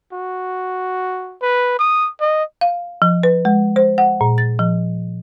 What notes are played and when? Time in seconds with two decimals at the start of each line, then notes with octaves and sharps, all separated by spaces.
0.13 F#4
1.42 B4
1.79 D#6
2.20 D#5
2.61 F5
3.02 F3
3.23 B4
3.45 G#3
3.76 C5
3.98 F#5
4.21 A#2
4.38 A6
4.59 F3